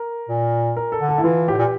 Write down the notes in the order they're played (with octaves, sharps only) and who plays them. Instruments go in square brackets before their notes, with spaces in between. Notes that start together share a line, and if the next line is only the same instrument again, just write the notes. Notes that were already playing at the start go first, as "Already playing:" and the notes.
Already playing: [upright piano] A#4
[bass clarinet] A#2
[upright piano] A#4
A4
[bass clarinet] D3
[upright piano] A4
E4
[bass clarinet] E3 [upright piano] F4
[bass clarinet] A2 [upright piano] G4
[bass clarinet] A#2